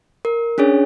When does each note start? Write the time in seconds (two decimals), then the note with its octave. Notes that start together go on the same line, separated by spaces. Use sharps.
0.25 A#4
0.58 C#4 D4 G#4 C#5